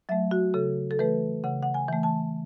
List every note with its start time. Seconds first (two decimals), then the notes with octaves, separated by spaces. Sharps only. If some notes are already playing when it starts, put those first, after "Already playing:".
0.09 F#3 A3 E5
0.31 F#4
0.54 C#3 A4
0.91 A4
0.99 E3 A3 B4
1.44 C#3 F#5
1.63 F#5
1.74 G#5
1.88 E3 A3
2.03 A5